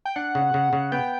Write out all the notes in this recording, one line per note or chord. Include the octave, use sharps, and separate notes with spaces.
G5
D4 F#5
C#3
C#3
C#3
B3 G5